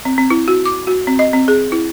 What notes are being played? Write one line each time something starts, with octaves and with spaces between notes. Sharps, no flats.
C4
C4
E4
F#4
D6
F#4
C4
D#5
C4
G#4
E4